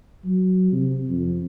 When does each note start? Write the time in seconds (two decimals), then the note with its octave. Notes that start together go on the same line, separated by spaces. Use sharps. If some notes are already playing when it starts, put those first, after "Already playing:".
0.24 F#3
0.72 C3
1.08 F2